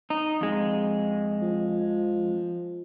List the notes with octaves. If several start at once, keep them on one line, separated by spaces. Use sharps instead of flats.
D#4
F2 G#3
F3